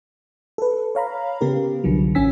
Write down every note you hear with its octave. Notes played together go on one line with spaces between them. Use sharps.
A4 B4
C#5 F5 A#5 B5
C#3 B3 G4 A#4
C2 D3 F3 F#3
A1 C#4 G#5 E6 B6